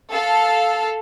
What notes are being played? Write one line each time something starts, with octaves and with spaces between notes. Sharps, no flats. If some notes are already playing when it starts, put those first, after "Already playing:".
A4 F5